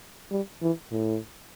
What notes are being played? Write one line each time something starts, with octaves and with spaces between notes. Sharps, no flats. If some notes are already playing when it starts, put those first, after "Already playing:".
G3
E3
A2